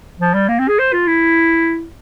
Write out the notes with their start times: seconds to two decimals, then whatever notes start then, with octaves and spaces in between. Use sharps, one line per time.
0.20 F3
0.34 G3
0.48 A#3
0.59 C4
0.68 G#4
0.79 C5
0.93 F4
1.07 E4